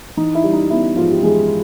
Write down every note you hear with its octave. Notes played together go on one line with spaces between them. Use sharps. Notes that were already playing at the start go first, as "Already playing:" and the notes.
E3 D#4
E4
G3
D#4
B3 E4
G#2 F3 F4
G4
E3 G#3 G#4